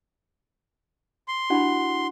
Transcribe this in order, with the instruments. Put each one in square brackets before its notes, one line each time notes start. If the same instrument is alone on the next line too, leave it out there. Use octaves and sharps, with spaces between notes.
[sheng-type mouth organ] C6
[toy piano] D4 G4 B5 [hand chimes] E4 F#4 F#5